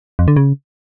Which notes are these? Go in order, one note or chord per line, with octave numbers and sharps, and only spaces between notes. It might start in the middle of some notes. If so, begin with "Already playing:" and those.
F2
D3
C#3